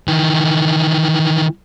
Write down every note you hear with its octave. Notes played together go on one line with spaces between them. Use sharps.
D#3 E3